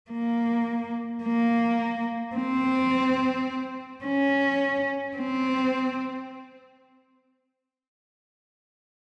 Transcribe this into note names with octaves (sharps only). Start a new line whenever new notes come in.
A#3
A#3
C4
C#4
C4